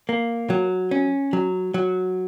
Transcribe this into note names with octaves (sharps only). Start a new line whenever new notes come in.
A#3
F#3
C#4
F#3
F#3